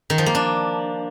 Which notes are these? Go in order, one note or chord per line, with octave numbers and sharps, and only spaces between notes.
D#3
F3
A#3
D4